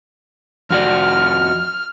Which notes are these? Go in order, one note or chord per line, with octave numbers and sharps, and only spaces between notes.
F2 F#4 D5 F6